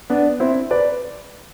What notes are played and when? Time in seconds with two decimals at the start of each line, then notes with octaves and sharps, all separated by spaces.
0.10 B3 D4
0.40 C4 E4
0.71 B4 D5